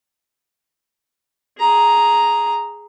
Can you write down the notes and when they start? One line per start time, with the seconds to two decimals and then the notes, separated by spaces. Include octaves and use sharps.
1.58 G#4 A#5